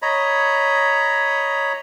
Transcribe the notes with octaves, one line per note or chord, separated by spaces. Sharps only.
C#5 D#5 A#5 B5